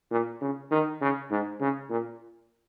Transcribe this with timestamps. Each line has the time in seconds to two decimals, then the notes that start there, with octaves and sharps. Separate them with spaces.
0.11 A#2
0.41 C#3
0.71 D#3
1.01 C#3
1.31 G#2
1.61 C#3
1.90 A#2